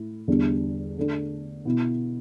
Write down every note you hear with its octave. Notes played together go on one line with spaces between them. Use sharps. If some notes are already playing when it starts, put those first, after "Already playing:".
Already playing: A2 E4
E2 D3 G3 D4
D3 A3 D4
B2 B3 E4